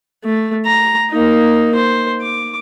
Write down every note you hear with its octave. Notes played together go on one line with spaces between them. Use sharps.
A3
A#5
A#3 D#4
C5
D6